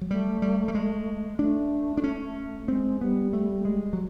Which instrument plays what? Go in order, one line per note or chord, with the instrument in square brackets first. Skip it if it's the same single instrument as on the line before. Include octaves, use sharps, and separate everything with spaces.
[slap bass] F#3
[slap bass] G3 [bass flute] A3
[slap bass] G3
G3
G#3
[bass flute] A3 [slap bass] D4
[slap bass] D4
C#4
[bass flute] G#3 [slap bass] C4
[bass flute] G3 [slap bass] B3
[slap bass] A3
G#3
F#3